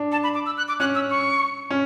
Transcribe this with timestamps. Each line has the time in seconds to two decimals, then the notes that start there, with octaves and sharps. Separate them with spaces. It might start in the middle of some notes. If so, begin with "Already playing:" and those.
Already playing: D4
0.12 A5
0.23 B5
0.35 D6
0.46 E6
0.58 F#6
0.68 D6
0.80 C#4 F#6
0.95 E6
1.10 C#6
1.70 C#4